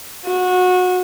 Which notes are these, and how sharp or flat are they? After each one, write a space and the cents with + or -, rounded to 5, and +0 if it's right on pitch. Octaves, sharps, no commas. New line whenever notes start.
F#4 -25